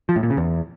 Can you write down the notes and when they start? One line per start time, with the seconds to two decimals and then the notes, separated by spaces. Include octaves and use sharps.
0.09 F3
0.16 A2
0.23 A#2
0.30 C#3
0.37 E2